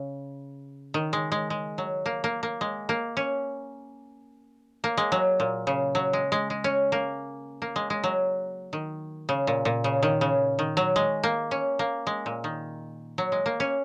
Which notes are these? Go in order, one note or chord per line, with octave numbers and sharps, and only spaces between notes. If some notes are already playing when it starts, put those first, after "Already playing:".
Already playing: C#3
D#3
G#3
G#3
G#3
F#3
A#3
A#3
A#3
G#3
A#3
C#4
A#3
G#3
F#3
A#2
C#3
F#3
G#3
G#3
G#3
C#4
A#3
A#3
G#3
G#3
F#3
D#3
C#3
A#2
A#2
C#3
D#3
C#3
D#3
F#3
G#3
A#3
C#4
A#3
G#3
A#2
D#3
F#3
G#3
A#3
C#4